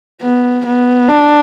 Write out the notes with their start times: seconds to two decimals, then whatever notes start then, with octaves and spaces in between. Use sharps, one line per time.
0.22 B3
0.65 B3
1.08 D4